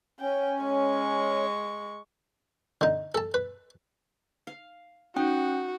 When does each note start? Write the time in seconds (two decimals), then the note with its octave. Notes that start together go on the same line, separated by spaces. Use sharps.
0.20 C#4 G5
0.63 G#3 C#6
2.81 D3 D#4
3.15 A4 A5
3.34 B4
4.47 F5
5.16 C#4 D#4 F#4 G5